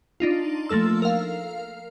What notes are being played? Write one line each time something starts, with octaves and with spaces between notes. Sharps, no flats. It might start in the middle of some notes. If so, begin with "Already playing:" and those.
D4 D#4 F4
F3 A3 A#3 A4 E6
A#4 F5